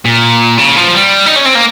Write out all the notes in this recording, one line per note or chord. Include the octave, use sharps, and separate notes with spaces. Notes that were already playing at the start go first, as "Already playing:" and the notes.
A#2
C#3
F3
G3
D#4
C#4
C4
A#3